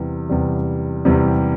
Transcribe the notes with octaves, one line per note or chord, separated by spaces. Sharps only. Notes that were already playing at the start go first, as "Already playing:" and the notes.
Already playing: E2 C3 G3
E2 C3 G3
E2 C3 G3